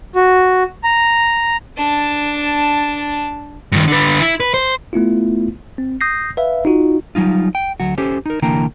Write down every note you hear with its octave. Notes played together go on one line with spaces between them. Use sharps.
F#4
A#5
D4 A5
G2 D#3
D3 B4
E4
B4
C5
A3 B3 E4 F4
C4
D#6 G6 A#6 C7
B4 E5 F5
D#4 F4 F#4
F#3 G3 D#4 F4
G5
D2 F#3 F#4
C#4 G4 A4 C5
D#4 A#4
C2 D3 E3 A#3 G5 A#5